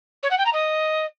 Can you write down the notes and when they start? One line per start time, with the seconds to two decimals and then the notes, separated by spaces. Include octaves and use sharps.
0.23 C#5
0.30 F#5
0.38 G5
0.46 A#5
0.53 D#5